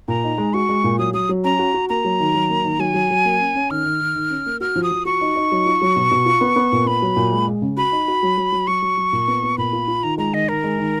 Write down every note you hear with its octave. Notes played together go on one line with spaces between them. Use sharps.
A#2 A#5
D#4
G#3
F#4 C#6
G#3
A#2
F#3 D#6
F#3 D#6
F#3
C#4 A#5
F#4
F#4
A#3 A#5
F#3
D#3
F#3
A#3
D#3
F#3 G#5
F#3
F#3
A#3
C#4
C#4
D#3 F6
D#3
D#3
D#3
C#4
A#3
F#4 F6
F3
D#6
F3
F#4 C#6
D#4
D#4
F#3
F4
F#3
B2
B2
F4
B3
B3
A#2
B3 B5
F#3
A#2
G#3
G#3
C#3
F#4 B5
D#4
F#4
F#3
F#3
F#3
F#3 C#6
F#3
F#3
A#2
B3
B3
A#2 B5
F4
F4
D#3 A#5
G#3 A#5
D#3 D#5
D#3 A#4
G#3
D#3